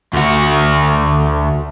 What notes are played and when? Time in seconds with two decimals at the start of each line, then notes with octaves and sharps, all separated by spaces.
0.13 D2 F#4